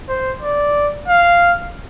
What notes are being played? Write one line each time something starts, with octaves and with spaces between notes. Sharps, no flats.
C5
D5
F5